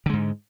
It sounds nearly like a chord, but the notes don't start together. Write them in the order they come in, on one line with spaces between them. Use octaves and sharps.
D3 G#3 G#2